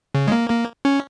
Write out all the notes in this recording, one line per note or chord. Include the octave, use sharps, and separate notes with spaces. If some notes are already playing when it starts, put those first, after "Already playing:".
C#3
G#3
A#3
A#3
C#4